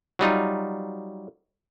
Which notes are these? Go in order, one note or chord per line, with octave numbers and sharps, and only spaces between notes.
F#3 G3 D#4 F4